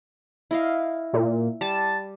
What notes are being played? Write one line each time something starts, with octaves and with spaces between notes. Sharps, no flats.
E4 D#5 F5
A#2
G3 A5